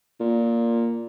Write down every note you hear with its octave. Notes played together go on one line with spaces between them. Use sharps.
A#2